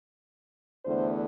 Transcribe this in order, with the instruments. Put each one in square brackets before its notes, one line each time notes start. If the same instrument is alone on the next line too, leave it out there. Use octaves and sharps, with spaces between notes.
[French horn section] E2 D3 A3 D4 C5